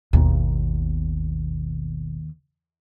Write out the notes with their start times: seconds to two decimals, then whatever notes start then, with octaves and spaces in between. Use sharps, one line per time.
0.13 G#1 D#2 B2